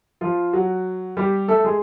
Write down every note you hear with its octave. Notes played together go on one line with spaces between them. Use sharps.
F3 F4
F#3 F#4
G3 G4
A3 A4
G#3 G#4